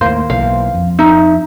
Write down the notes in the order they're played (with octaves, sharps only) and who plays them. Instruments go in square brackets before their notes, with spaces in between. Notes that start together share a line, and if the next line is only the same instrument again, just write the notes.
[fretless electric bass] D#2 A2 [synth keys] A#3 C5
[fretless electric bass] B1 E3 [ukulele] F5
[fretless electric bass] F2
[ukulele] D#4 [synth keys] E5